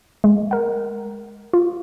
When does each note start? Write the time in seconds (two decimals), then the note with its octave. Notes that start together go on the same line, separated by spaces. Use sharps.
0.24 G#3
0.51 A#4 F#5
1.53 F4